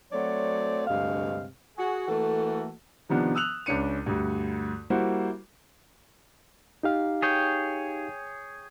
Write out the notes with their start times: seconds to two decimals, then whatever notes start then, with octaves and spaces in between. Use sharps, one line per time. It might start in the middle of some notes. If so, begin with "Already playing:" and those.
0.12 F#3 A3 C4 F#4 C#5 D5
0.87 D2 G2 C3 G#3 F5
1.78 F#4 G#4
2.08 E3 A3 A#3 F#4 A4
3.09 C3 D#3 F3 B3 D4
3.35 D#6 E6 F#6 F7
3.66 C#2 C#4 D4 C#7 D#7
4.06 D2 G2
4.90 G3 A#3 E4 F#4 C5
6.83 D#4 G4 F5
7.22 G#4 C#5 G5